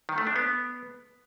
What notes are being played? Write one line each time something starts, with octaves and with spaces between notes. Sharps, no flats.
D#3
A3
D4
B3